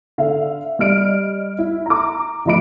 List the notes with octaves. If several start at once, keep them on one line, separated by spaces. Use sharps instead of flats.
D3 E5 F5
G3 D#5 F6 D7
E4
A#5 D6
D2 F3 D#5 B5 D7